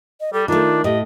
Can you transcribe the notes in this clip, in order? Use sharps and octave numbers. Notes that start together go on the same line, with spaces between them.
D#5
G3 A4
D#3 A3 D4 F4
A2 G4 D#5